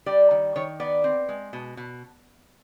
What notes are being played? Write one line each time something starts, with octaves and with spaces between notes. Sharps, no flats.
G3 D5
D#3
D#3 C#5
B3 D5
C4
G#3
B2
B2